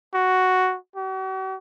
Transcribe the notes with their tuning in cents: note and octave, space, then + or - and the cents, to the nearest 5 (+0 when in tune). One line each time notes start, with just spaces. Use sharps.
F#4 +5
F#4 +45